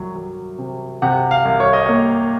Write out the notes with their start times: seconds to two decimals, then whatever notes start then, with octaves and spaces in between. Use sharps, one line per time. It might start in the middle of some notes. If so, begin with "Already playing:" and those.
Already playing: C2 F#3
0.15 F#3
0.59 C3
1.02 C3 F#5
1.31 F5
1.45 C2
1.60 C#5
1.73 D#5
1.86 A#3 C#5